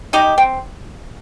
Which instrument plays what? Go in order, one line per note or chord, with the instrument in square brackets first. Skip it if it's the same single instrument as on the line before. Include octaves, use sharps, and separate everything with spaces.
[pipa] D#4 G4 [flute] D#5
[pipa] C4 [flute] G5